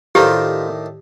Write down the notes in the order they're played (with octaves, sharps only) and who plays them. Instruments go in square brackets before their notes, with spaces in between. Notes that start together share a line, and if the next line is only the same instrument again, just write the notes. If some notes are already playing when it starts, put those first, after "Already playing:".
[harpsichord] A2 D#3 D4 [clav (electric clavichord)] F4 A#4 C5 [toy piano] G4